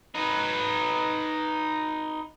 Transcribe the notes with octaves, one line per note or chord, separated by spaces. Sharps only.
D#4 B4